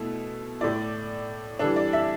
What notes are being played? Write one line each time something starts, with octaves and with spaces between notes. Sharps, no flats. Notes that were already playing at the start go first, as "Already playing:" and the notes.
Already playing: B2 A3 E4
A2 A3 E4 D5
E3 G3 D4 A4
D5
E5